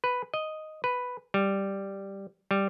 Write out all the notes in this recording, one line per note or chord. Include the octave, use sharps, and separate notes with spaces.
B4
D#5
B4
G3
G3